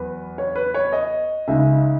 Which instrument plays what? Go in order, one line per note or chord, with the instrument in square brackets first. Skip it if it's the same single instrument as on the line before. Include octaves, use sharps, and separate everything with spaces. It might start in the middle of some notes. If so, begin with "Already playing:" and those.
Already playing: [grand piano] E2 F#3 B4
C#5
B4
C#5
D#5
C#2 C#3 G#3 D#4 E5